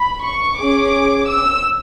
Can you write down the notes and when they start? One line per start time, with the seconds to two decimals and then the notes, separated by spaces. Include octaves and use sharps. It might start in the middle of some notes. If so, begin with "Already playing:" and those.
Already playing: B5
0.24 C#6
0.58 C#4 G#4 D6
1.28 E6